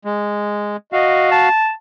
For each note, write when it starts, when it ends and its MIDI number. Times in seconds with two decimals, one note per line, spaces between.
0.05 0.77 56
0.93 1.49 66
0.93 1.28 75
0.93 1.49 77
1.31 1.71 81